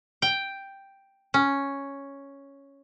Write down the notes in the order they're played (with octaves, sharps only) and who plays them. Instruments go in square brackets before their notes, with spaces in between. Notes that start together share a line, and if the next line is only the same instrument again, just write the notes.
[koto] G5
C#4